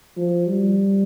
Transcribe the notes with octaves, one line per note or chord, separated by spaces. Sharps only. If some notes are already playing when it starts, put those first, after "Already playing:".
F3
G3